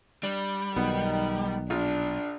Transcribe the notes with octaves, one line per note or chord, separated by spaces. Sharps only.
G3 D4
B1 D#3 B3
A#1 D4 F4